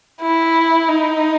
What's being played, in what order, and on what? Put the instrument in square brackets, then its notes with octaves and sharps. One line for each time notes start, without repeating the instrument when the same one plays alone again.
[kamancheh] E4
D#4